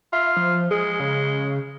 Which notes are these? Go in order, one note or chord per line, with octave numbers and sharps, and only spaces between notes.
F4 E5
F3
G#3 G#4
C#3